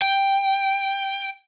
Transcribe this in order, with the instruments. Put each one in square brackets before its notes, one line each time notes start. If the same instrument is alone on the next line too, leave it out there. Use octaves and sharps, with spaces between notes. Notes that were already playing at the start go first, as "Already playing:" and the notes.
[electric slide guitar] G5